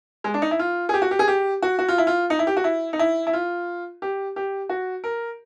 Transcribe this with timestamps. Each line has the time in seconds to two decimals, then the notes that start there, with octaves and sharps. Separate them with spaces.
0.24 G#3
0.34 D4
0.42 D#4
0.51 E4
0.59 F4
0.89 G#4
0.94 G4
1.02 F#4
1.11 G4
1.19 G#4
1.28 G4
1.62 F#4
1.79 F#4
1.88 F4
1.98 E4
2.07 F4
2.30 D#4
2.39 E4
2.47 G4
2.57 F#4
2.64 E4
2.93 D#4
2.99 E4
3.27 E4
3.33 F4
4.02 G4
4.36 G4
4.69 F#4
5.04 A#4